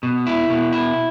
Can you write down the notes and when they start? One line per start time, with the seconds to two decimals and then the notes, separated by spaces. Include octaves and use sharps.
0.03 B2
0.27 E4
0.50 B2
0.73 E4